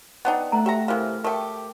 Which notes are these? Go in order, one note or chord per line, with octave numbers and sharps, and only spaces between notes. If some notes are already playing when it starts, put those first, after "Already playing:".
B3 D4 D#4 F#5 G5
A3 F#5 A#5
G4 E5 G5 A#5
C3 E3 A#4 C5 F5 F6
A3 G4 A#4 G5